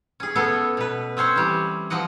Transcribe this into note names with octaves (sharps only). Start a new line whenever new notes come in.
C#4 G#4
A3 B3 C#4 A4
B2 B4
C4 C#4 C5 C#5
E3 G3
F3 F#3 D#5 F#5